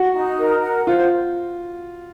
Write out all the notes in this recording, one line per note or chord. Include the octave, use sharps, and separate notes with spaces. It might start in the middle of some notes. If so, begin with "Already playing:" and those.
Already playing: F#4
D#4
A#4
F#5
F4 C5